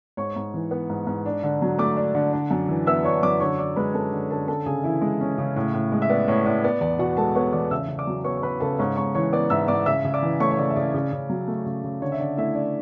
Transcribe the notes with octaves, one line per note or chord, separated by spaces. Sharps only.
G#2 C#5 C#6
G#2
E3
B3
G#2
G#2
D4
D3
F#3
A3 D5 D6
D4
D3
D4
F#2
E3
B3 E5 E6
D4 C#5 C#6
F#2 D5 D6
D3 C#5 C#6
D3 D5 D6
G#3 B4 B5
C#4 A4 A5
D3
D3 A4 A5
C#4 A4 A5
C#3 G#4 G#5
E3 E4 E5
G#3
C#4
C#3
A2
A2
G#3
E5
B3 D5
A2 C#5
A2 D5
B3 D5
E2 D5
B2 F#4 F#5
G#3 A4 A5
B3 C#5 C#6
E2 D5 D6
C#3 E5 E6
C#3
D5 D6
F#3
B3 C#5 C#6
C#6
C#3 B4 B5
C#3 A4 A5
G#2 C#5 C#6
G#2 C#5 C#6
E3 C#5 C#6
B3 D5 D6
G#2 E5 E6
G#2 D5 D6
C#3 E5 E6
C#3
D5 D6
E3
A3 C#5 C#6
C#5
C#3 D5
E5
C#3 D5
C#3
C#3
F#3
A3
C#3
C#3
D3 C#5
E5
D3 D5
A3 E4 E5
D4 D5